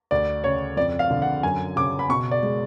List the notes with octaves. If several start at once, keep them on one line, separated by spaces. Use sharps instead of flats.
D2 D5
C#3 C#5
F2 D5
F5
D3
F#5
F#2 G#5
C#3 D6
B5
B2 C#6
D5
G#3